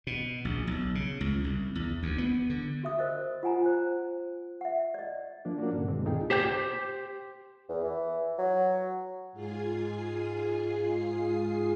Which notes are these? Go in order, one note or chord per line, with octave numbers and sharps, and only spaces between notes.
B2
A#1
B1
C#3
C#2
C2
E2
D2
B3
D3
F#4 E5 D#6
A#4 C5 D#5
F4 F#5 G#5 A#5
C5
E5 F#5
D5 D#5
F3 A#3 D4
A#3 C#4 D4 F#4
G2 A#2 D3
G2 B2 D#3 G#3 C4
C2 D#4 F4 G#4 A4 G5
G4 C5 G5 G6
E2
E3
F#3
G#2 F4 G#4 G#5 C7